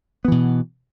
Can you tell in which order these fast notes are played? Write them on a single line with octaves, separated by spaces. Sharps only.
B3 E3 B2